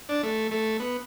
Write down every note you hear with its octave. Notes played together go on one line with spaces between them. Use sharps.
D4
A3
A3
B3